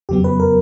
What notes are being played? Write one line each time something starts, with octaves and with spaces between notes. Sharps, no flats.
F2 C#3 F#3 B3 G4
B4
A#4